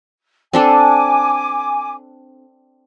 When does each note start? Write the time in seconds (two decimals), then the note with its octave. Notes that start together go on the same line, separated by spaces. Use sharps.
0.53 C4 D4 A4 G#5 D6